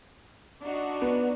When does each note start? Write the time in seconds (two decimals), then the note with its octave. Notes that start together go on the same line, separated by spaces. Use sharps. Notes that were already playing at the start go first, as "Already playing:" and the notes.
0.63 D4 D#4 F#4
1.02 B3